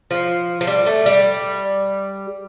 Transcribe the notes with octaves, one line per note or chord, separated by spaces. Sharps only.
F3
F3
G3
A3
G3